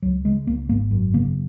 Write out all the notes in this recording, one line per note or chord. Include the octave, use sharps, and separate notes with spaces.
C#2 F#3
C#3 G#3
C#2 A#3
G#1 A#3
F#2
C#3 A#3